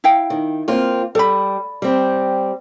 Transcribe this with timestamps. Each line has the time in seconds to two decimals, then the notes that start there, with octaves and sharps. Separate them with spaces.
0.04 E4 F5 G5
0.30 D#3
0.68 A#3 C4 F4
1.15 G3 A4 B5
1.82 G3 C4